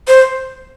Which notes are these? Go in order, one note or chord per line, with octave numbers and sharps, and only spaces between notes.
C5